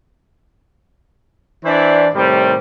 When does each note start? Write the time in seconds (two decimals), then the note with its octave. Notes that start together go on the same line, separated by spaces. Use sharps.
1.64 E3 D4 E4 C5 D5
2.14 A2 C3 D#3 G3